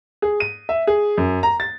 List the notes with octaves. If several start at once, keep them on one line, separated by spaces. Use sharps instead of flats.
G#4
D#7
E5
G#4
F#2
A#5
A6